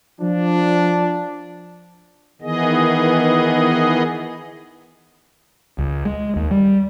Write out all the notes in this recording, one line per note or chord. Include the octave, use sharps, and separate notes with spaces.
F3 D4
D#3 E3 B3 G#4 D#5
C#2
G#3
D#2
G3